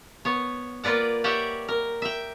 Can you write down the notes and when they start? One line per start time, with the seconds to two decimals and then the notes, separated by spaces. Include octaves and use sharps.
0.25 B3 C#5
0.83 A#3 F4 B4 D5 F#5
1.24 G4 C#5 D5 E5 F#5 G5
1.68 A#4
2.02 E5 G5